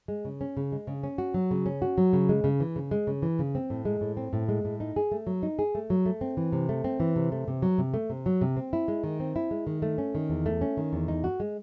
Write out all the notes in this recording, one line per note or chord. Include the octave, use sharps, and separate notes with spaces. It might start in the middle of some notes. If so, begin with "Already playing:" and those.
G#3
C#3
C#4
C#3
G#3
C#3
C#4
F#4
F#3
C#3
C#4
F#4
F#3
C#3
G#3
C#3
E3
C#3
G#3
C#3
E3
C#3
C4
A2
G#3
A2
C4
A2
G#3
A2
D#4
G#4
A3
F#3
D#4
G#4
A3
F#3
A3
C4
E3
C3
A3
C4
E3
C3
A3
C3
F#3
C3
A3
C3
F#3
C3
C4
E4
G#3
D#3
C4
E4
G#3
D#3
A3
C#4
D#3
E2
A3
C#4
D#3
E2
D#4
F#4
G#3